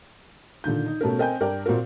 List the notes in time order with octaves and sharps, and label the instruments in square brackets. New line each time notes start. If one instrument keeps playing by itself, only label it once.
[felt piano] A#2 D3 D#3 G6
D#4
B2 A3 C#4 A#4
C4 A#4 D#5 G5 G#5 G6
G2 A#4 D5 G5
A#2 C4 F#4 A#4